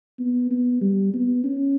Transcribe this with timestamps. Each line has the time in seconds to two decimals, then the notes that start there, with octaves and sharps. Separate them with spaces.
0.19 B3
0.51 B3
0.81 G3
1.14 B3
1.44 C#4